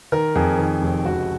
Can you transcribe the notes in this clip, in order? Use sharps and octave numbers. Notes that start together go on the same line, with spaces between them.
D#3 A#4
F2 G#4
D#3
F1
C#2 F#4